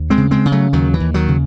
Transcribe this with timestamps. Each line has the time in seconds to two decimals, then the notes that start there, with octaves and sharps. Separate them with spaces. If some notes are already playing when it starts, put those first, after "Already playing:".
Already playing: D#2
0.10 G#3 C4
0.17 C#3
0.31 G#3 C4
0.45 C#3
0.52 F#3 A3
0.73 D#2 D#3 F#3
0.94 E3
1.00 D#2
1.14 D#3 F#3
1.28 C#3